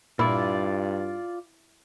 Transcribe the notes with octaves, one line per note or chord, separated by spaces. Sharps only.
G2 A#2 E4 F4 D5